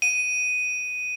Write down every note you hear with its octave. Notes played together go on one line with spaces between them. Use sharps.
D#7